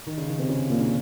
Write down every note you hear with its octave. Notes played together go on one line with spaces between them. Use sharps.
D#3
C#3
D#3
C3 C4
C#3 C#4
A#2 A#3
C#3 C#4